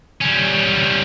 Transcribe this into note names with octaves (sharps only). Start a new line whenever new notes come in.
G3 C#4